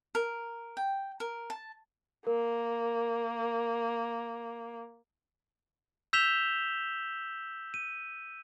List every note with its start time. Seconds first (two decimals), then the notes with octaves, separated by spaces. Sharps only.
0.15 A#4
0.77 G5
1.20 A#4
1.50 A5
2.27 A#3 A#4
6.13 E6 G6 B6 E7 F7 G7
7.74 D#7